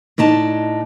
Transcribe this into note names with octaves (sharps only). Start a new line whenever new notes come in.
A2 D4 D#4 A5